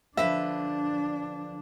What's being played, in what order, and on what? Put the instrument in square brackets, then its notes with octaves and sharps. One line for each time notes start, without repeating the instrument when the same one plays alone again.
[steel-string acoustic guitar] D3 F3 B4 [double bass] D4 [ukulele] E5